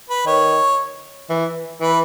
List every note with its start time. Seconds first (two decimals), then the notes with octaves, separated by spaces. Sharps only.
0.10 B4
0.26 D#3 C#5
1.30 E3
1.80 E3 B4